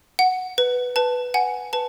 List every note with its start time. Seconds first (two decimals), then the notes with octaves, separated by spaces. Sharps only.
0.19 F#5
0.58 B4
0.96 B4 A5
1.34 F#5 G#5
1.73 B4 A5